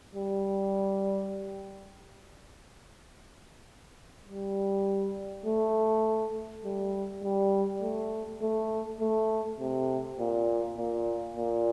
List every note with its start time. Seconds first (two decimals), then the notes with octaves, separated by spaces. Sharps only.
0.15 G3
4.28 G3
5.46 A3
6.64 G3
7.23 G3
7.82 A3
8.42 A3
9.01 A3
9.59 C3
10.19 A#2
10.78 A#2
11.36 A#2